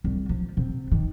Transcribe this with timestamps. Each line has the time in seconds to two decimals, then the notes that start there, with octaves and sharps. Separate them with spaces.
0.04 C2
0.29 F3
0.57 C3
0.91 D#3